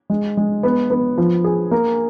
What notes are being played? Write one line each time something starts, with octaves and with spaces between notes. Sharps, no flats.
G#3
G#3
B3
B3
F3
G#4
A#3